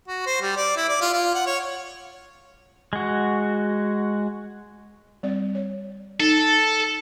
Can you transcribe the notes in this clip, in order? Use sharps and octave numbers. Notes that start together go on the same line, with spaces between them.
F#4
C5
G3
D5
E4
D5
F4
F4
F#5
C#5
G#3 F#4
G3 C4 D5
C#5
D#4 A4